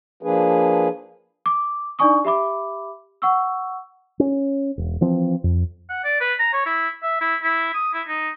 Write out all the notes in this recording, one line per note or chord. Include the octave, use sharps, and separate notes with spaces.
F3 A#3 D4 G#4 B4
D6
D4 D#4 D5 G#5 C#6 D#6
G4 E5 B5 D6
F#5 C#6 E6
C#4
E1
E3 F3 C4
F2
F#5
D5
B4
A#5
C#5
E4
E5
E4
E4
D#6
E4
D#4